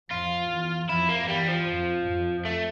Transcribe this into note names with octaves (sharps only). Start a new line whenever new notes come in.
F2 F4
E2
F2 E4
A#3
E2 G3
F3
F2
F2
A3